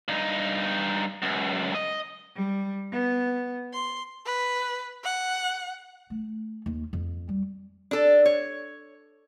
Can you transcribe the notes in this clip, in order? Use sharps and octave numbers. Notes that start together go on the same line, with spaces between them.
G2 D#4
C#2 F#2
D#5
G3
B3
C6
B4
F#5
A3
D#2
F2
G3
D4 A4
C#5